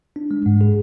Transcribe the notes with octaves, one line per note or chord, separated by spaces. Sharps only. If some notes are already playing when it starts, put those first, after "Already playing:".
D4
G#3
G#2
G#4